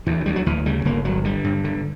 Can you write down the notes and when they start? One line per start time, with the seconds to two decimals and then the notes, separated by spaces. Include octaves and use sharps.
0.07 D2 E3
0.26 D2 G3
0.36 F#3
0.46 D2 E3
0.66 C#3 G3
0.85 G1 A#3
1.05 G1 F#3
1.24 D3 G3
1.44 G2
1.64 D3